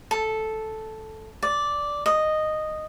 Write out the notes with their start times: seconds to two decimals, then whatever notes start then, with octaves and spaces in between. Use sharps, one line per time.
0.11 A4
1.43 D5
2.06 D#5